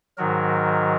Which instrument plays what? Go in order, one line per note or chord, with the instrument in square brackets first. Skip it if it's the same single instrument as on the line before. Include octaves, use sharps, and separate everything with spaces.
[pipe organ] G#2 D#3 F#3 F#4 A#4